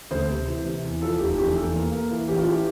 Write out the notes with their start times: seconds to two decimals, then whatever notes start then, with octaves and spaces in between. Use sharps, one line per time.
0.11 D2 C5
0.30 C3
0.48 E3
0.65 C3
0.84 E2
1.02 F3 A4
1.19 F1 G4
1.38 E2 G4
1.56 E2 A4
1.74 A#3
1.92 A#3
2.10 E3
2.28 A1 G4
2.38 F4
2.46 E3 G4